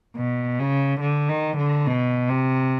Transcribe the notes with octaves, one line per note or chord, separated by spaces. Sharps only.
B2
C#3
D3
D#3
D3
B2
C3